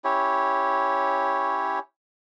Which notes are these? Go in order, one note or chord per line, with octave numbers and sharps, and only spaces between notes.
C#4 E4 G4 C#5